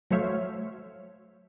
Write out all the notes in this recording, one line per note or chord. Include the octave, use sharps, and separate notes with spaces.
F#3 A3 C5 C#5 E5 F5